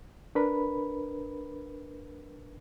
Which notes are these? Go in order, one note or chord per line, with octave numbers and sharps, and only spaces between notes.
D4 A#4 B4 B5